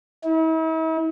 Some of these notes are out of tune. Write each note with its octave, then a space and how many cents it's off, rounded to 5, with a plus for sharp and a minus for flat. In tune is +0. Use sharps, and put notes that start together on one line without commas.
E4 -45